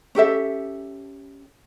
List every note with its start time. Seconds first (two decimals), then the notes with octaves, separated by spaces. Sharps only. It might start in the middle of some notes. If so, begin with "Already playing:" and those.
0.15 C#4 G4 A4 E5